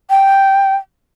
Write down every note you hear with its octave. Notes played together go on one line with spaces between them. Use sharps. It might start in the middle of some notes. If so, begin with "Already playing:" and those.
G5